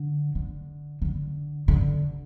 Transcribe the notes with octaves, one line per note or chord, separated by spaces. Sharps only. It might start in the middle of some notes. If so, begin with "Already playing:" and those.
Already playing: D3
D3
D3
D3